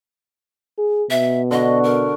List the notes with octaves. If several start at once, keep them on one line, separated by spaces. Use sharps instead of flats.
G#4
B2 E5
D3 F#4 D#5
A#4